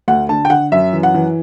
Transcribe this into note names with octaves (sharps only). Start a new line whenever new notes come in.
D2 F#5
D3 A5
G5
D3 F#5
F#2 E5
E3
F#5
E3